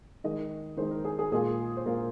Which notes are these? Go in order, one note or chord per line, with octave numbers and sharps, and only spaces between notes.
D#3 G#3 D#4 D#5
D#3 G#3 D#4 C5
A#4
G#4
G#4
A#2 G#3 F4 G#4
C5
A#2 G#3 F4 A#4